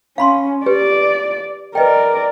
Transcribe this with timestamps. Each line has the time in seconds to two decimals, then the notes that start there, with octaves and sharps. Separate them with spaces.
0.18 C#4 F5 B5 C6
0.66 G4 B4 D5
1.75 A#4 B4 D5 D#5 G5